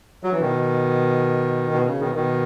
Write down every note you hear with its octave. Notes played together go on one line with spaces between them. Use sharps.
F#3
E3
B2 D#3
B2
C#3
B2 D#3
B2 D#3